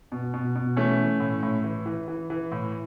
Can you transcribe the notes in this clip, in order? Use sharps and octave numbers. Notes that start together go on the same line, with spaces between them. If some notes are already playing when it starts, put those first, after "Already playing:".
B2
B2
B2
E3 A3 C#4
E3
A2
A2
E3
E3
E3
E3
A2